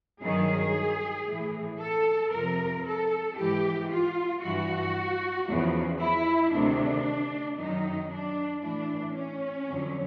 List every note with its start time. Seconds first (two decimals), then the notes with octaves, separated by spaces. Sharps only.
0.21 G2 D#3 F#3 G#4
1.26 A2 E3
1.79 A4
2.31 F2 C3 F3 A#4
2.85 A4
3.37 G#2 E3 G4
3.90 F4
4.42 G2 E3 F#4
5.47 E2 C#3 F3
5.99 E4
6.52 D2 C3 D#3 D4
7.57 F#2 D#3 F#3 D#4
8.10 D4
8.62 A2 E3 D4
9.14 C#4
9.67 F2 D3 F#3